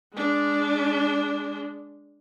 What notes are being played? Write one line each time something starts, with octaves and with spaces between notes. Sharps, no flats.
G#3 D4